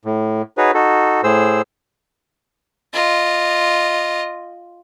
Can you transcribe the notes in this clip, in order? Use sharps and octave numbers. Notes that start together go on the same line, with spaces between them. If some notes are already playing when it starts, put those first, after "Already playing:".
A2
D#4 F#4 G#4 B4 C#5
D#4 F#4 A4
A2 G#4 C5 E6
F4 D#5